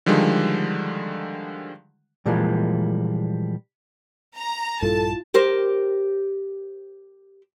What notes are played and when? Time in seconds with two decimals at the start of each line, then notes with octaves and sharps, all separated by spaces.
0.06 D3 D#3 F3 G3 G#3
2.26 A#2 E3 F3 G3 G#3 A#3
4.36 A#5
4.82 A#1 G2 G3 E4 F4 A4 A5
5.34 G4 A#4 C5